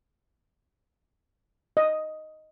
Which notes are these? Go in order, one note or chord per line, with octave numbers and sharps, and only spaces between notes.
D#5